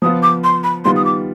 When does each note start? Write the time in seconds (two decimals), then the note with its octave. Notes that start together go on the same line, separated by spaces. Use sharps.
0.02 F3 B3 F4 D#6
0.23 D6
0.44 C6
0.63 B5
0.85 D#3 G3 B3 F4 C6
0.96 D#6
1.05 D6